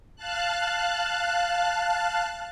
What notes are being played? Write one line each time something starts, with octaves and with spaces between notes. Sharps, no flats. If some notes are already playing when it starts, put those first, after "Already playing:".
F5 A5 F#6